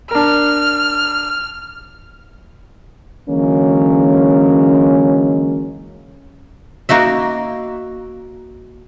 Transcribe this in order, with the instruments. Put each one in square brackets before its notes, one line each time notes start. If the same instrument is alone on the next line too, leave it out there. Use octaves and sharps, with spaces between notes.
[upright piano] D4 A#4 [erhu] F6
[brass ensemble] D3 E3 F#3 G#3 A#3 C#4
[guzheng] A#3 D#4 F#4 E5